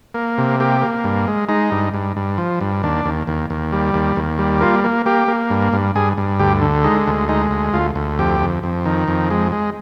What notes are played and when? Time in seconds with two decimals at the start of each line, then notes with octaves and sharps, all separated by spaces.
0.15 A#3
0.38 C3
0.60 A#3 G4
0.81 A#3
1.04 G2
1.27 G#3
1.49 G#3 D#4
1.71 G2
1.94 G2
2.17 G2
2.38 F3
2.61 G2
2.83 D#2 D4
3.05 D#2
3.27 D#2
3.50 D#2
3.73 G3
3.94 D#2
4.16 D#2
4.39 G3
4.61 A#3 F4
4.84 A#3
5.06 A#3 G4
5.28 A#3
5.50 G2
5.73 G2
5.96 G2 G#4
6.18 G2
6.39 D2 G4
6.62 D3
6.84 G#3 D#4
7.07 D2
7.29 G#3 D#4
7.51 D2
7.73 D2 F4
7.96 D2
8.19 F2 G4
8.41 F2
8.63 F2
8.85 D#3
9.08 F2
9.31 G#3
9.52 G#3